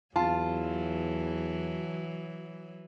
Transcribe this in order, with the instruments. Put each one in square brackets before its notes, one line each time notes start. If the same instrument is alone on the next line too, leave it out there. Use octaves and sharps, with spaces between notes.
[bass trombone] E2 [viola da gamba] E3 F#3 [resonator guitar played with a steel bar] F4 [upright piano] A5